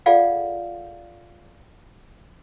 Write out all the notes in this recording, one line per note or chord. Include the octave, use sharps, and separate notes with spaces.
F4 G#4 A4 D5 F5 F#5